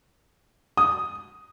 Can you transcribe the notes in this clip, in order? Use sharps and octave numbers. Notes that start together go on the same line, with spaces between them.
D#6